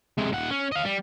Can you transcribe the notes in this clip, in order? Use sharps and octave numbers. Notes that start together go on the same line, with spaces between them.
C3 G#3
D#2 F#5
C#4
D#5 F5
G3